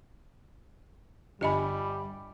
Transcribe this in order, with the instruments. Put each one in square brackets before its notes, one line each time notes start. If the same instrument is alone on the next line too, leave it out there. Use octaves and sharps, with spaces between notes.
[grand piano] G1 B5 [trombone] G3 [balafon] G4 D#5 G#5